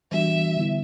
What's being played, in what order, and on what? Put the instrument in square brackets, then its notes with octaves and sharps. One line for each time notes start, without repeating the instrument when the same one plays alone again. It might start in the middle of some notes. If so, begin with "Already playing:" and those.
[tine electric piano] E3 G3 B3 D4 F#4 [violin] E5
[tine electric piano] D3 G3 B3 E4